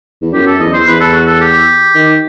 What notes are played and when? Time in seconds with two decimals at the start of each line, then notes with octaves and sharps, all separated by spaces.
0.22 E2
0.33 F#2 G4
0.47 A4
0.60 E2 D#5
0.74 C5
0.87 E2 B4
1.00 A4
1.14 F#4
1.27 A4
1.41 G4
1.95 D#3